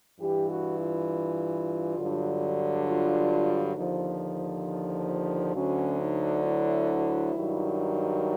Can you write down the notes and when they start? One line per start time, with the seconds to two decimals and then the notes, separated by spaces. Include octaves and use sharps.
0.20 G2 E3 G4
0.49 F#4
0.79 F4
1.98 G2 D3 F#3
2.87 F4
3.76 D#2 D3 F3
5.55 D2 D3 F#3 C#4
6.00 D#4
6.44 E4
7.34 G2 D#3 F#3